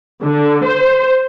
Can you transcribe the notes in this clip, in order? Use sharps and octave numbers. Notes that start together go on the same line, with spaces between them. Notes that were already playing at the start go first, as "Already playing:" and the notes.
D3
C5